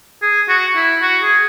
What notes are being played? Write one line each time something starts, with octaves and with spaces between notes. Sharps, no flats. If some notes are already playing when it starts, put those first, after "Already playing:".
G#4
F#4
E4
F#4
G#4